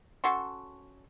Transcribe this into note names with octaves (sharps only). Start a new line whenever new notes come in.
C#4 F#4 A4 C6